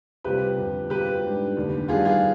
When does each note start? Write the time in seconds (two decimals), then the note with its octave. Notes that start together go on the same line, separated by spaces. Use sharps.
0.24 C2 C3 G3 C4 F4 G4 B4
0.58 G1 F2 C3
0.90 B2 G3 C4 F4 G4 B4
1.23 G#2 G3 D4
1.56 F1 D#2 D3
1.88 G2 D#3 G3 B3 F4 G#4
2.05 F4 G#4